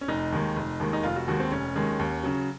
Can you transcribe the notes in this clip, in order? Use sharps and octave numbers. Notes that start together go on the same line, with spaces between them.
C#4
F1 D#4
D#2 D#3 G#3
F1
D#2 D#3 G#3
D#4
F1 F4
F#4
D#2 D#3 G#3 F#4
C4
F1 C#4
D#2 D#3 G#3
D#2
C#3 F#3